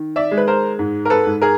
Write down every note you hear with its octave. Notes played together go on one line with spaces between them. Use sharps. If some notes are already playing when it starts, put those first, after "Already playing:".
Already playing: D#3
D5 E5
G#3
B4
A#4 C5
G#2
A#4
A4 B4
G#2
G#4 A#4